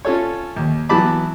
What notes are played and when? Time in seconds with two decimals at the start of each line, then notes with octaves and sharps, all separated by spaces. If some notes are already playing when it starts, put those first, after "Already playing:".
0.05 C#4 F4 A4 C#5
0.57 D#2
0.89 E3 F#3 B3 A5 B5 D6